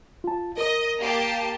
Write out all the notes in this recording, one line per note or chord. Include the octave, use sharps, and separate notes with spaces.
F4 A5
A#4 D#5 D#6
A#3 G4 A5